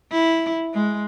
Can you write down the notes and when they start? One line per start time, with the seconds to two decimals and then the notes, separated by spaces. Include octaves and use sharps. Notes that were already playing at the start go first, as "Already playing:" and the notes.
0.11 E4
0.73 G#3